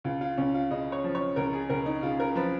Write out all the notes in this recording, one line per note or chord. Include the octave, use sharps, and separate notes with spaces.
C#2 F4
F4
C#2 C#4
F4
C#3 D#5
C#5
F3
C#5
C#2 A#4
G#4
C#2 A#4
D#4
C#3 F4
A#4
F3 B4